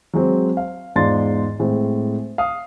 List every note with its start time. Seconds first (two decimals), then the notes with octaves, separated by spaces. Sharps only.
0.13 F#3 G#3 C4
0.57 F5
0.96 E2 G#2 F4 D5 C6 A6
1.59 A2 G#3 C4
2.38 F5 D#6